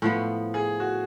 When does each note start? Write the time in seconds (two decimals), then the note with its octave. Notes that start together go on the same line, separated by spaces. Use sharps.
0.02 A2 F3 B3
0.54 G#4
0.80 F#4